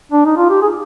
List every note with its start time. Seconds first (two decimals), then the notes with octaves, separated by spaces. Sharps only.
0.12 D4
0.25 D#4
0.37 F4
0.50 G4
0.61 G#4